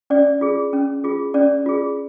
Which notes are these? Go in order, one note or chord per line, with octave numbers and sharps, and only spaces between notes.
C#4 D5
F4 G#4
C#4
F4 G#4
C#4 D5
F4 G#4